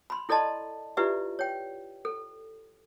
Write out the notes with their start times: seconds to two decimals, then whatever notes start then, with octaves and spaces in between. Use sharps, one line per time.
0.10 B5 C6
0.29 E4 A4 D5 D#5 A5 C6
0.97 E4 F4 G4 B4 D5 E5
1.39 C#5 G5
2.05 A4